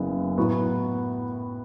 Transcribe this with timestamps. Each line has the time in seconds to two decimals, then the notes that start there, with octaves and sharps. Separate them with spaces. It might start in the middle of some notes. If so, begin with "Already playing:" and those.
Already playing: F#1 F#2 C#3 B3
0.38 A2 F#3 B3 F#4